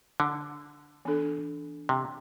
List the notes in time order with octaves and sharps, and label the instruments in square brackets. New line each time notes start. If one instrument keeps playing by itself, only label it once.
[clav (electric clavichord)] D3
[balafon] E3 B3 D4 A4
[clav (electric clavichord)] C3